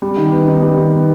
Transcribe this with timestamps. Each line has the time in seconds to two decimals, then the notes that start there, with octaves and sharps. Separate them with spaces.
0.02 G3
0.17 D#3
0.32 B3
0.48 D#4
0.62 G3
0.78 D#3
0.92 B3